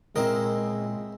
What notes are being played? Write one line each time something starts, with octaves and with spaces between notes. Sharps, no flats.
A#2 G#3 C4 E4 A#4 D#5